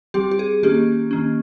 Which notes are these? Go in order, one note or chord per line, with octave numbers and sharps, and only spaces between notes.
G3 C4 G4
G4
G#4
D#3 A#3 C#4 G4
D#3 A#3 C#4